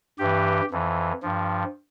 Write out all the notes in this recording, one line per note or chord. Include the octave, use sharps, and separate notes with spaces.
G2 E3 G4
F2 E3
G2 F3